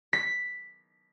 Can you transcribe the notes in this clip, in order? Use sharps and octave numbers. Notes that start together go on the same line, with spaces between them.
B6